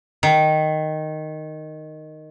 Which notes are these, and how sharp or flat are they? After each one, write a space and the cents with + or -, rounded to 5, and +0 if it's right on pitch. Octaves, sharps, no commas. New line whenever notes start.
D#3 -5